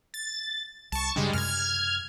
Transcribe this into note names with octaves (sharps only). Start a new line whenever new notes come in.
A6
C2 A5 C#6
G2 C#3 G3 G#3 D4
F#2 C3 F6 G#6